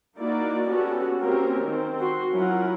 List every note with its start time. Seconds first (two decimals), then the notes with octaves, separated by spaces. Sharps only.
0.19 A#3 D#4 E4 F#4 A#4 D5
0.68 B3 C#4 F#4 G4 A4
1.21 A#3 C4 C#4 G4 A#4
1.63 D#3 C4
1.99 F#4 C6
2.32 F#3 C#4 E4 F4 A#4 F#5